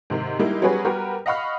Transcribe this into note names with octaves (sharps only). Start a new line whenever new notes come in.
G#2 C3 D#3
G3 G#3 A#3 D#4 E4
F#3 G3 B3 C#4 G#4 B4
G3 B3 F#4 G4 A#4 B4
D#5 F5 F#5 B5 C#6 F6